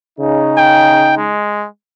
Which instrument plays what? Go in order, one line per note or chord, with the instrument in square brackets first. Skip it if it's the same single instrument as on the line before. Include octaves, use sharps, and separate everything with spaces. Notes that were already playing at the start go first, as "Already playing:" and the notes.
[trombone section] C#3 D#4
[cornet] G5
G#3